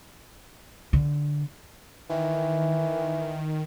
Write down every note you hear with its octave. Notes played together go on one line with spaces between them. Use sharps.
D3
D#3 E3